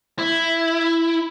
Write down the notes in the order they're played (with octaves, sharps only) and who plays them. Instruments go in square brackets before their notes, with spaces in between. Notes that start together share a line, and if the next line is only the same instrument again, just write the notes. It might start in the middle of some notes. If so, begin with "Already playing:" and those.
[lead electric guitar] E4